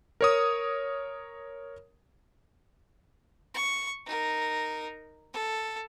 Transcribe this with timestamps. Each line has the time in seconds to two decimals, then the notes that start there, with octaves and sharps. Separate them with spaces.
0.21 A#4 C#5 D#6
3.54 C#6
4.06 D#4 A#4
5.33 A4